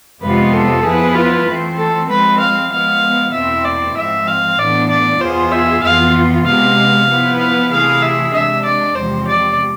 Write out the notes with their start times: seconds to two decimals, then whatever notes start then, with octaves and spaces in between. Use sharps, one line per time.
0.22 F2 C3 G#3 B3 F4 B4
0.53 A4
0.84 F3 B3 E4 G#4 B4
1.15 F4
1.47 E3 A3 C4
1.78 A4
2.09 F3 G#3 C4 B4
2.40 F5
2.71 F3 G#3 B3 F5
3.33 E2 B2 A3 C4 E4 E5
3.65 D5
3.96 G#2 F3 G#3 C4 E5
4.28 F5
4.58 A2 E3 B3 D4 D5
4.90 D5
5.21 E2 B2 B3 F4 G#4 C5
5.52 E5
5.83 F2 E3 B3 F4 F5
6.46 C3 G#3 B3 F5
7.08 F3 B3 E4 B4
7.39 F5
7.71 C3 E3 A3 E4 G#4 F5
8.03 E5
8.33 C3 G#3 D4 E5
8.65 D5
8.96 E2 C3 F3 G#3 C4 C5
9.28 D5